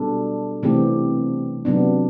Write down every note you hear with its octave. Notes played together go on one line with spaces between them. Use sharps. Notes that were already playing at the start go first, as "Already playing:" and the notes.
Already playing: B2 G3 D4 A4
C3 E3 A3 C4 G4
C3 F#3 B3 D4